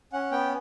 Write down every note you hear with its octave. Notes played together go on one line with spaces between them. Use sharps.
C#4 F#5
B3 G5